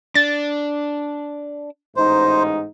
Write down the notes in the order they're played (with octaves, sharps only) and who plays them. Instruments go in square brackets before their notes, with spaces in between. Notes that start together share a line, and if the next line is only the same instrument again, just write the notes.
[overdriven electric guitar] D4 [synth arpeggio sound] A6
[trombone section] A1 G#2 D#4 [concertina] C5